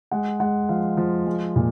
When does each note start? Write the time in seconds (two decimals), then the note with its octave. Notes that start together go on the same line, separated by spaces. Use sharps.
0.11 G#3 F#5
0.40 G#3 F#5
0.69 F3 F5
0.97 F3
1.26 G#3
1.56 A#2